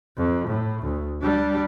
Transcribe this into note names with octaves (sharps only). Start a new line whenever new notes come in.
F2
A2
D2
G3 D4